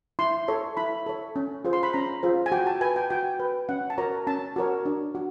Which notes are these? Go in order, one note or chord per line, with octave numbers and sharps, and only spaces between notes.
E4 C6
A4 C#5
E4 B5
A4 C#5
C#4
F4 G#4 C5
C6
B5
C#4 A#5
F4 G#4 C5
G#5
F#4 G5
A5
B4 G#5
G5
F#4 G5
B4
C#4 F#5
A5
F#4 A#4 C#5 A#5
C#4 A5
F#4 A#4 C#5
D4
F#4